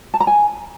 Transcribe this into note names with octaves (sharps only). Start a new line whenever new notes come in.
A5
A#5
G#5